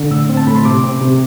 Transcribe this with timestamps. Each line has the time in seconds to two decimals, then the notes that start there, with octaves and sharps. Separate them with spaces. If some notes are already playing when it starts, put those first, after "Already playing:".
Already playing: D3
0.11 A2 E6
0.29 C4
0.37 A5
0.47 A2 B5
0.55 C6
0.65 C3 D6
0.84 C4
1.01 C3